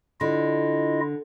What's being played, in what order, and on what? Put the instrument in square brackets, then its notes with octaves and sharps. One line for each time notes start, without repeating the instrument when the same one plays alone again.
[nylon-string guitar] D3 [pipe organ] E4 F4 D#5